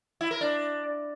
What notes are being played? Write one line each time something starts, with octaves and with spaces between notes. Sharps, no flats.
E4
A#4
D4